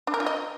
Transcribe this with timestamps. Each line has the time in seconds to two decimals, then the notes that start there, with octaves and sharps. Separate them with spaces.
0.07 D4
0.14 A#4
0.20 F4
0.26 D#5